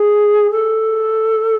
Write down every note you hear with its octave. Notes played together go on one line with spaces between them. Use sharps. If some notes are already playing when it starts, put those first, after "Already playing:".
Already playing: G#4
A4